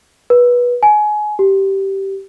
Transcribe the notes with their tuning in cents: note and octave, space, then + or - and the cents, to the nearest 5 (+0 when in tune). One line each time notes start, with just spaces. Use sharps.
B4 -20
G#5 +25
G4 -15